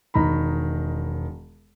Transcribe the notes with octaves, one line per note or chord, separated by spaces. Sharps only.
E1 D#3 A#5 B5